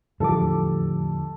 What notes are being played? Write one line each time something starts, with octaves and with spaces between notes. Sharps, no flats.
E2 A2 D3 F3 G3 A4 D6